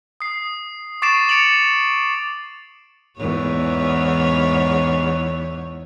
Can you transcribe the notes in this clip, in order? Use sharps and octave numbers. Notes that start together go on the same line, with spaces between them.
D#6 C7
C#6 D6 A6 C7 D7 E7
A6 C#7 D7 F7 F#7
E2 G#2 C#5